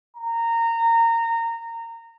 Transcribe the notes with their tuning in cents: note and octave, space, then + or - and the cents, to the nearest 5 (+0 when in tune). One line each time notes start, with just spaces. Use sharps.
A#5 -20